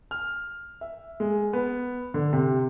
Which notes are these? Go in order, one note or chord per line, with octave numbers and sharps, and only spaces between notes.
F6
E5
G#3
B3
D3
C3